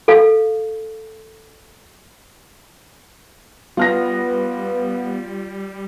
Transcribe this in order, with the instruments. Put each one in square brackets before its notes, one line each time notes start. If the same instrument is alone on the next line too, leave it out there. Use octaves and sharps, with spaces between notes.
[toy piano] A4 F5
[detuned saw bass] G3 [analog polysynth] B3 [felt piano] F4 F6 A#6